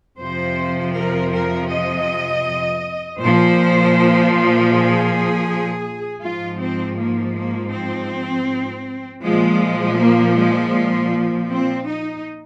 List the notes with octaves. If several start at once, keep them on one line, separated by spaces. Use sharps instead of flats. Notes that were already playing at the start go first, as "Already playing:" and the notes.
F2 C3 F3 C5
A#4
A#4
D#5
A#2 F3 C5
G#4
G#2 F3 F4
C4
A#3
A#3
C4
A#2 F3 G#3
A#3
G#3
C4
D#4